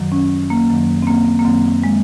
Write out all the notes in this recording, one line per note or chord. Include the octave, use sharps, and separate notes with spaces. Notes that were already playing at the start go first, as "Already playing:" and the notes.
Already playing: F#2 D#3 F#3
C#4
A#3
F#2 D#3 F#3
C4
A#3
A#3
F#2 D#3 F#3 C4
G#3